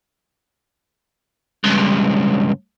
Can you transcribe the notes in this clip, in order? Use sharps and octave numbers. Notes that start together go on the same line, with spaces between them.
C#2 G2